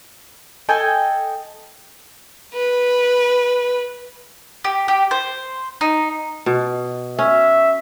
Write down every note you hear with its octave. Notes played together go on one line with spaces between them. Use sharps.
A4 D#5 G5 G#5
B4
G4
G4
C5
D#4
B2
C#4 E5